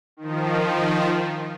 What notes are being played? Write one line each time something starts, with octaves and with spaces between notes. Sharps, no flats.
D#3 F3